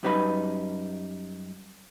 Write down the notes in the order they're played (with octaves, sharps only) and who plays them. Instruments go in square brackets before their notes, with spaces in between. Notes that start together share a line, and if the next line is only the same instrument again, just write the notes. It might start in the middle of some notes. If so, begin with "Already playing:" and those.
[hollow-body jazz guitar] F#2 G3 B3 D#4 B4 B5